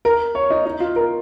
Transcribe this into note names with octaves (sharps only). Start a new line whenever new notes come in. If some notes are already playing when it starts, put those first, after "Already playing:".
A#4
C#5
D#4
D#4
F4
A#4